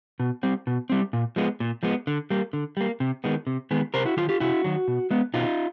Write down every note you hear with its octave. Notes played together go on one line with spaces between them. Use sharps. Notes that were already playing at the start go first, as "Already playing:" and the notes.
B2
G3 C4
B2
G3 C4
A#2
F3 G#3 B3
A#2
F3 G#3 B3
D3
G3 A#3
D3
G3 A#3
C3
D#3 G#3 B3
C3
D#3 G#3 B3
C3 A#4 C5
E4 F#4
D#3 F#3 F4 G4
F4 G4
C3 E4 F#4
D#3 F#3
B2
G#3 B3
B2 D#4 F4